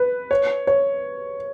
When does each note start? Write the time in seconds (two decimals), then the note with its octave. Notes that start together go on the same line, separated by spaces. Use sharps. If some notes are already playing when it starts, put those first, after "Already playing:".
Already playing: B4
0.31 C#5
0.67 C#5